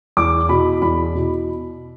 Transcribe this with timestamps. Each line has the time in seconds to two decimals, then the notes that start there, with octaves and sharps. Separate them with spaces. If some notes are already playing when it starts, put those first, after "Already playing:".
0.17 E2 D6
0.49 B2 B5
0.82 E2 B5
1.15 B2